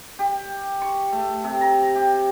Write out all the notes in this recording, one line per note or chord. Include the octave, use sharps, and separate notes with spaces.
G4
C#6
A3
C3
A#5
G4